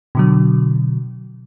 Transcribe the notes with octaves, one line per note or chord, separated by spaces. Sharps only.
B2 D3 F#3